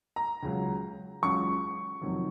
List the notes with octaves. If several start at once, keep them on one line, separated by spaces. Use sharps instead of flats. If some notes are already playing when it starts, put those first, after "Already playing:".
A#5
C#2 C#3 F#3
C#2 C#3 F#3 C#6
F2 C3 D#3 F#3